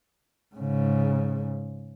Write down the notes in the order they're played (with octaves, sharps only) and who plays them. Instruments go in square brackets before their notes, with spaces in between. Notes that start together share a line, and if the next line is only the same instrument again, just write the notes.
[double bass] G#2 C#3